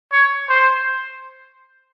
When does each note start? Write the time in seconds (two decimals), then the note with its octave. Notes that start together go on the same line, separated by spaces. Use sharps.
0.12 C#5
0.50 C5